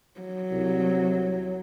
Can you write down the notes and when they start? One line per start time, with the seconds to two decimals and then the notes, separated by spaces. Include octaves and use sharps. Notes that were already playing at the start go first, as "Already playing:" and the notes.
0.21 F#3
0.51 C2